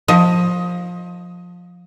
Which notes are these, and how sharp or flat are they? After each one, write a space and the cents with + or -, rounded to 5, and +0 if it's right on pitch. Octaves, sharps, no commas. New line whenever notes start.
F3 +20 D#5 +15